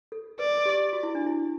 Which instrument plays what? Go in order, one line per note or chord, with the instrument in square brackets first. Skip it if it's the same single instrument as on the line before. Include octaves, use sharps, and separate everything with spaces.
[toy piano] A4
[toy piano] B4 [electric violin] D5
[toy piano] G4
F#4
E4
D4
E4